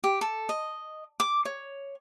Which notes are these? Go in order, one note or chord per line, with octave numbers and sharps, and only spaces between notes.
G4
A4
D#5
D6
C#5